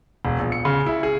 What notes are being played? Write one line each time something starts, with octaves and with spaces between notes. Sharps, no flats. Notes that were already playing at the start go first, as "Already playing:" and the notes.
E1
A#1
C#7
C#3
E4
G#4